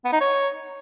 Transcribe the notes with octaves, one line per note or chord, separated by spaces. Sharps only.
B3
D#4
C#5